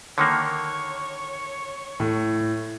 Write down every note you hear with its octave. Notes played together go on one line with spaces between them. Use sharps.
D3 D#3 A#3 C#5
A2